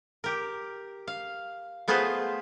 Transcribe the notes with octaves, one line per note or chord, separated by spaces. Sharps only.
G4 A#4
F5
A3 B3 F4 G#4 B4 C5